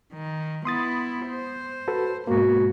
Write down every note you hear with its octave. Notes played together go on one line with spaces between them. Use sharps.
D#3
B3 E4 C6 D#6 A6
C5
F#4 A4 B4
G#2 B2 A#3 F#4